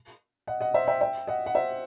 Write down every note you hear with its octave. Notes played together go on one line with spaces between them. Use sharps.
D#5 F#5
D#5 F#5
C5 E5
E5 G5
E5 G5
D#5 F#5
F#5
C5 E5